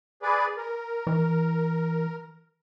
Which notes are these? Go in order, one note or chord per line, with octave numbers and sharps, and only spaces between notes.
G#4 B4 D5
A#4
E3